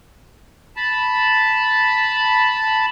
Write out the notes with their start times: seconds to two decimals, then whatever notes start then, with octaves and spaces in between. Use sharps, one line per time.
0.76 A5 B5